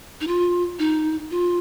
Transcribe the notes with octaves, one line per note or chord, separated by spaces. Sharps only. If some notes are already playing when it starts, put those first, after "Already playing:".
D#4
F4
D#4
F4